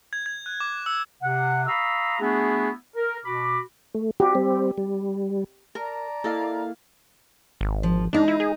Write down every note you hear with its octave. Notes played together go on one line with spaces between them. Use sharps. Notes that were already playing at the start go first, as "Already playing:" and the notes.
G#6
G#6
F#6
D6
E6
C3 F#5
F5 A#5 B5 C#6 D#6 E6
A3 B3 D4 E4 F#4 G#4
A#4
B2 F#4 B5 D6
A3
F#4 G4
G3 C4
G3
A#4 D5 A5 A#5
A#3 E4 A4 D#5 F5
G#1
F3
G#3 D4 D#4
E4
G#4